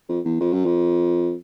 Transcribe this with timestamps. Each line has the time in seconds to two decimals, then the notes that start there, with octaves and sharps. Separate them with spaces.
0.09 F2
0.25 E2
0.40 F2
0.53 F#2
0.65 F2